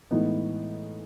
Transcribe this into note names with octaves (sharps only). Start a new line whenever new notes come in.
A2 E3 G#3 B3 D#4